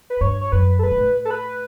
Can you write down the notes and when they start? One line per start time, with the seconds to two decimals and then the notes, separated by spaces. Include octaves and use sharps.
0.10 B4
0.21 G2 C#5
0.41 C#5
0.52 F#2 B4
0.79 A4
0.83 A2 B4
0.91 B2
0.98 A2
1.25 A4
1.31 B4